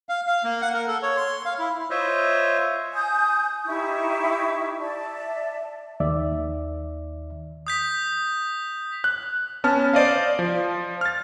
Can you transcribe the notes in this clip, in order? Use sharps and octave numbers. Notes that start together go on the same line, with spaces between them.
F5
F5
A#3
F#5
A#4
A4
C#5
C6
F5
E4
F4 C5 C#5 D#5 E5
G#5 D#6 G6
D#4 E4 G4 C#6
D5 E5 A5
D#2 D#3 D5 E5
D#6 G6 B6
F#6
B3 C#4 A5 F6
C5 D5 D#5 F5
F3
F6 A6